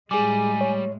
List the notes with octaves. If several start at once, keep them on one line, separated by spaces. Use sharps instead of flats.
A2 G3 G#3 G#4 G#5 D6
C#5